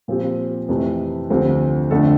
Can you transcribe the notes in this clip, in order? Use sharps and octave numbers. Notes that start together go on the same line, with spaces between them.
A#2 F3 C4 G4
F2 C3 E3 A3
D2 D3 F3 C4 G4
F2 D3 A3 D4 A4